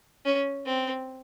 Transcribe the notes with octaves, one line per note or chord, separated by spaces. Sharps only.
C#4
C4